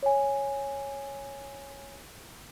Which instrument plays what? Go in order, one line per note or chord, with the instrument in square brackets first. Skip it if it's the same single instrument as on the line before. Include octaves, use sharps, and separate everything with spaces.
[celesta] C#5 G#5